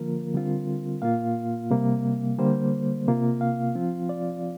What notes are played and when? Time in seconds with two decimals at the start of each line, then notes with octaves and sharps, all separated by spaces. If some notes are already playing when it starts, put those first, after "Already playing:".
Already playing: D3 F3 A#3 F4 A#4
0.34 D3 G3 C4 F4
1.02 A#2 A#3 F4 F5
1.71 C3 G3 A#3
2.39 D3 G3 A#3 C5
3.07 C3 A#3 F4
3.41 F5
3.75 F3 C4 F4
4.09 D5